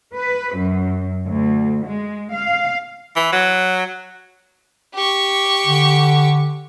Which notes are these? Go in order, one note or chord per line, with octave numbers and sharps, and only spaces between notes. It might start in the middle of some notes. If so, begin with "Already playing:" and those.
B4
F#2
D2
G#3
F5
E3
F#3
G4 C#6
D3